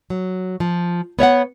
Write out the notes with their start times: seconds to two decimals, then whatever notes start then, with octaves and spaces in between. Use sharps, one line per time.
0.10 F#3
0.60 F3
1.19 B3 C#5 E5 F#5